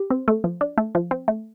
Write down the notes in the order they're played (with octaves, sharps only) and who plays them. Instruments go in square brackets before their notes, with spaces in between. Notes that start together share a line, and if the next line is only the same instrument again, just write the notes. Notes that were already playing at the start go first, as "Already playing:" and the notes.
Already playing: [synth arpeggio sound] G4
C4
A3
F3
D4
A3
F3
C4
A3